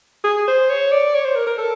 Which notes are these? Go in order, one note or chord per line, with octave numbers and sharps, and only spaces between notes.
G#4
C5
C#5
D5
C#5
C5
A#4
A#4
A4